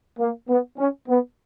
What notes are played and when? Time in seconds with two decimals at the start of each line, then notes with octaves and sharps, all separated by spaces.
0.19 A#3
0.49 B3
0.78 C#4
1.08 B3